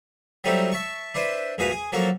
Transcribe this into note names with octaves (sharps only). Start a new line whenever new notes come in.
F#3 G3 A3 C4 D#4 E4
E5 A5 C#6
D4 E4 B4 C5
A#1 E2 F#4 G#4 B4 F5
G#4
F3 F#3 A#3 F#4 A4